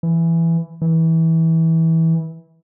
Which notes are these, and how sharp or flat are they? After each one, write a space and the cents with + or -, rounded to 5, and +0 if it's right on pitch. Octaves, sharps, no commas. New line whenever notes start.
E3 +10
E3 -20